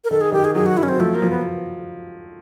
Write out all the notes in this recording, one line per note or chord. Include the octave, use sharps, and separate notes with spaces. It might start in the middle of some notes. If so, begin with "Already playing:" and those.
A#4
D#3 A4
G#4
D#3 G4
G#4
F#3 G#4
F#4
F#3 E4
C#4
C4
F3 A3
A#3
F3
B3